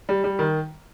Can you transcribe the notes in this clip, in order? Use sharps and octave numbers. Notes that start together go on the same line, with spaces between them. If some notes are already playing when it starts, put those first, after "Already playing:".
G3
G3
D#3